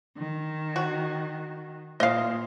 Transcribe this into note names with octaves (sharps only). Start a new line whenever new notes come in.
D#3
F#4
A#2 D#5 F5